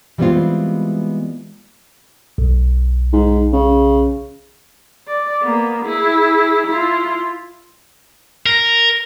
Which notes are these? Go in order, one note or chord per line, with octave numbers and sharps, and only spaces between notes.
E3 G3 G#3 B3 C4 F4
B1
G#2
C#3
D5
A#3 B3
E4 G#4
E4 F4
A#4